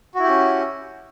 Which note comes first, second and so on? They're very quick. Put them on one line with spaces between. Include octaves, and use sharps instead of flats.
F#4 E4 G4 C#4